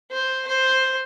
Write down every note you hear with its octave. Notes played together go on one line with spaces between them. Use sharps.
C5
C5